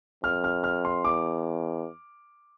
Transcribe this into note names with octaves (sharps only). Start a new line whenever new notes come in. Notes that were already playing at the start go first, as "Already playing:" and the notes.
F2 F6
F6
F6
C6
E2 D6